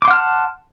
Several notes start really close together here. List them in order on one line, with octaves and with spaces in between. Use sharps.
D6 C6 F#5 F6 A5